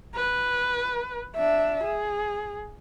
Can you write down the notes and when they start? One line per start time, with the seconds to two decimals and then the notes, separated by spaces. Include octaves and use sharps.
0.15 B4
1.36 D4 E5
1.84 G#4